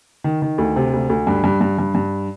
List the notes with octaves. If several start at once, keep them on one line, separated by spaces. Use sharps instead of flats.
D#3
D#3
D2
C3
D2
D2
G2
G2
G2
G2
G2